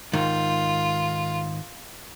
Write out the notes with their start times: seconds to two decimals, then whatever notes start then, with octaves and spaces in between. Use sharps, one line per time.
0.13 G#2 D#3 F4